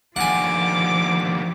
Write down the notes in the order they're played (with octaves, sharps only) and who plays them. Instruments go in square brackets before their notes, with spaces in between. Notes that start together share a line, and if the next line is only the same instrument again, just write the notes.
[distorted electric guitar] D#2 D3 [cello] F3 [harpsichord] F#5 G#5 [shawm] D6